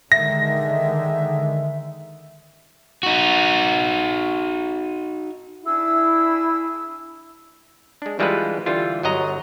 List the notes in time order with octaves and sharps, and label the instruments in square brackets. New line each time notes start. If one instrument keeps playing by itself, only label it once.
[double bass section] D3 D#3 G#3 [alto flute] E5 [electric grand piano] A#6
[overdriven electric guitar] D#4 F#4
[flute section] D4 G#4 E6 [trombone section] E4
[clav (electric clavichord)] G#3 D4
E3 G3 G#3 F4 A4 B4
D3 E3 G3 F4
G1 F#3 D#5 A#5